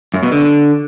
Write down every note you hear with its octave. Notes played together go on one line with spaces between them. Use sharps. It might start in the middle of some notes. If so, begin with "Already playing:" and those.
F#2
B2
D3